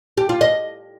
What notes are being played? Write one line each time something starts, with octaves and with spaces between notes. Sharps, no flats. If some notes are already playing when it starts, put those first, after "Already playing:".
G4
F4
D#5